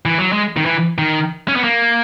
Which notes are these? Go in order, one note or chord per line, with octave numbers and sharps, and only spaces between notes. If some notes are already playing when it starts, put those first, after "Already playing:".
E3
F#3
G#3
D#3
E3
D#3
C#4
B3
A#3